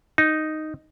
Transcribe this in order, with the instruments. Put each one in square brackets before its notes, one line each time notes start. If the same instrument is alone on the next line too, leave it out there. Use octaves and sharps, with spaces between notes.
[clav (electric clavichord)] D#4